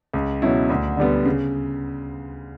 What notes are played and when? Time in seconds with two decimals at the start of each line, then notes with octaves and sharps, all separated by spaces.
0.14 C#2
0.42 B2 F#3 C#4 E4
0.70 D2
0.97 D3 G3 B3
1.25 C#3